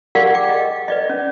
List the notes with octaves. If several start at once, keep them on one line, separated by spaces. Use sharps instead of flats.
G4 G#4 A#4 D5 F5 F#5
G5 D6
D#5
B4 D5 D#5
C#4